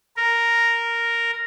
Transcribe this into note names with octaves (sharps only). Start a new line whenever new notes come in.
A#4